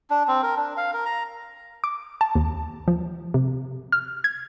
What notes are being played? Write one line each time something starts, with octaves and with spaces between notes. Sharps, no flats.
D4
C4
A#4
D4
F5
A#4
A#5
D6
A5
D#2
F3
C3
F6
G#6